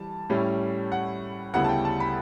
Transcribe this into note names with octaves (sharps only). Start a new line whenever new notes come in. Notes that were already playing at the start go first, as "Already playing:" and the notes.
Already playing: E3 G3 A5
A2 G3 C#4 E4
F#5
D2 C#3 G3 B3 E4 F#5
A5
G5
A5
B5